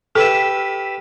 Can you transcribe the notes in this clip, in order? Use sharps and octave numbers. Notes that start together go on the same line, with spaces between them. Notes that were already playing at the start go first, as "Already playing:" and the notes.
G4 A4 B4 E5